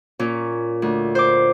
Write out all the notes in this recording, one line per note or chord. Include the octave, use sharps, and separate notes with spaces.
A#2 C#4
D2
C5 D6